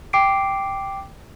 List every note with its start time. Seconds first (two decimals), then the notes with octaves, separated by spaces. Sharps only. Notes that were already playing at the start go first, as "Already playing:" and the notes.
0.13 G5 D6 C7 D7